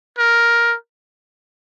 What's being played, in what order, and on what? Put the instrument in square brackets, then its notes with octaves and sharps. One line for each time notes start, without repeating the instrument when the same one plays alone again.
[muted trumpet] A#4